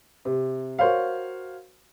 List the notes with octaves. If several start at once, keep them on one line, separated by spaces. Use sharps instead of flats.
C3
F#4 A#4 C5 C#5 F5